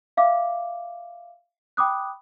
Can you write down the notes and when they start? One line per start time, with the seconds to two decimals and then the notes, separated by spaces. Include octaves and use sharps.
0.17 E5 F5 D6
1.77 G5 B5 D6 D#6 F#6